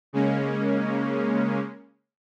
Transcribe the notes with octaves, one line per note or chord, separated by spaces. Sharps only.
C#3 G#3 A#3 C#4